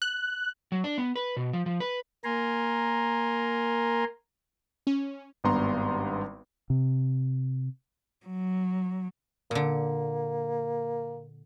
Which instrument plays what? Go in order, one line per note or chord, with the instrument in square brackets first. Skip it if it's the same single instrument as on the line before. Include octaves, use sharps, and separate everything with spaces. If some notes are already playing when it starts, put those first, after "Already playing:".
[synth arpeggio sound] F#6
[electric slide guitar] F#3
D4
B3
B4
B2
F3
F3
B4
[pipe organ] A#3 A#4 G#5 A#5 C6
[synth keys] C#4
[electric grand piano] G#1 G2 G3 B3 A#5 C6
[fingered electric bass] C3
[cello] F#3
[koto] A#2 D3 [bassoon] A#3